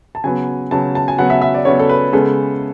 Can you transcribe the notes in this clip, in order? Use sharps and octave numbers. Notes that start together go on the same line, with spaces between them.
A5
C#3 F#3 B3 G#5
C#3 F#3 B3 A5
A5
G#5
C#3 F#3 B3 F#5
E5
E5
D5
C#3 F#3 B3 C#5
A4
B4
C#3 G#3 B3 A4